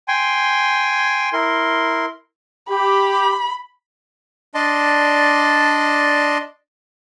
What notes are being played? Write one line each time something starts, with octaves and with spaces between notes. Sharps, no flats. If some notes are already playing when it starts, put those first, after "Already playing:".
G5 G#5 C6
E4 A#4 C6
G4 B5
D4 D5 D#5 A5 C6